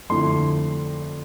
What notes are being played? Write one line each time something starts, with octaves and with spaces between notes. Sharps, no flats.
F2 D3 A3 E4 C6